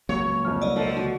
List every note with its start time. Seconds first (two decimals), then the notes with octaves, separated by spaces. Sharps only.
0.09 C#2 C#3 F#3 A#3 C#5
0.45 F2 F3 F6
0.62 C2 D5 D#5
0.76 B2 F3 D4 A4 A#4
0.97 D3 F#4